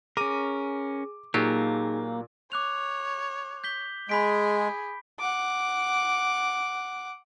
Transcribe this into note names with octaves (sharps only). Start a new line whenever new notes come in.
C#4 G#4 A#4 D6 D#7
A#2 F#3 A#3 D#4 F4 G4 G#4
C#5 D6 F#6 F7
G6 B6 G7
G#3 G#4 B5 B6 D7
F#5 D6